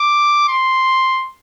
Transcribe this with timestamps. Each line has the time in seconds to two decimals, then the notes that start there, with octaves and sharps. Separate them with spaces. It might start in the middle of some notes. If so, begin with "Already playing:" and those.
Already playing: D6
0.48 C6